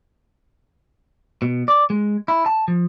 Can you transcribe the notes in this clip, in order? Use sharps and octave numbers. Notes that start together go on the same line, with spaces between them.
B2
D5
G#3
E4
A5
F3